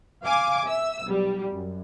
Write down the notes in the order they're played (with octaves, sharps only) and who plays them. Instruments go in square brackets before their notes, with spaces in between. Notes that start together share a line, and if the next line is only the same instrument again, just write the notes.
[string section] F5 G#5 D6
E5 E6
B1 G3
F#2